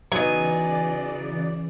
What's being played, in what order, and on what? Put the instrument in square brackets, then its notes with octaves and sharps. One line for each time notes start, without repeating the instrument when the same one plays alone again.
[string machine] C#3 E3 D5 [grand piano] F#3 B3 D#4 [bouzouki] G#5